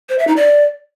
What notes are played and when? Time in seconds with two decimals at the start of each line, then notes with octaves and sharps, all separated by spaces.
0.09 C5
0.18 E5
0.27 D#4
0.36 D5